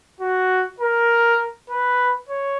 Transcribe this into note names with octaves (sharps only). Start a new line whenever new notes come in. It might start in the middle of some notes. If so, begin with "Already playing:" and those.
F#4
A#4
B4
C#5